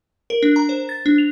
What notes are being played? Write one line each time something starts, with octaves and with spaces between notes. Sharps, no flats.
A#4
D4
A#5
C5
A6
D4
F7